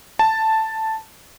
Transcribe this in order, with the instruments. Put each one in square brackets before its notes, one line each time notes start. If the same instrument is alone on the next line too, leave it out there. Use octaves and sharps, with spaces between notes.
[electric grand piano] A5